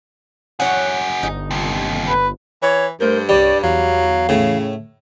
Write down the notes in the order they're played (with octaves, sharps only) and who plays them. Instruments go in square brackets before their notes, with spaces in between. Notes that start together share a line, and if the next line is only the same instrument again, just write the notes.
[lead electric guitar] F#4 G#4 [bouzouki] C#5 F#5
[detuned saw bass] G1 [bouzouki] D#4
[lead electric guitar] D#2 C3
[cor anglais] B4
[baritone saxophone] E3 [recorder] C#5
[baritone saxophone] G2 [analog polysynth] A3 C5 G6 [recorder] A#4
[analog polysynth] C2 C#5 [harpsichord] G3 [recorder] D5
[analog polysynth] E2 [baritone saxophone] F#3 [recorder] F5
[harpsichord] A2 [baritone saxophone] C#3